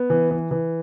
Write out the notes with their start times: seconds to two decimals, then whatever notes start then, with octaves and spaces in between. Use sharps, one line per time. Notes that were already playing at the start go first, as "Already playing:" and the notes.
Already playing: B3
0.10 E3
0.31 E3
0.51 E3